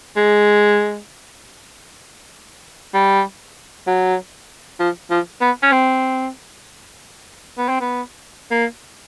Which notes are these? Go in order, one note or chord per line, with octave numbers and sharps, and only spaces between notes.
G#3
G3
F#3
F3
F3
B3
C#4
C4
B3
C4
B3
A#3